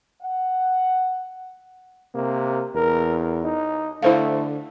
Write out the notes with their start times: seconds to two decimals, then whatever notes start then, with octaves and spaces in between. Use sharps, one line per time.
0.22 F#5
2.15 C3 A#3
2.75 E2 A#4
3.43 D#4
4.03 D3 A3 E4 C5 F5